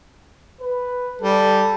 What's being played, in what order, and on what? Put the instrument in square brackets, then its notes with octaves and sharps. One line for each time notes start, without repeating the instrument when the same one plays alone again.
[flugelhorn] B4
[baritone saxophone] G3 [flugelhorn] A4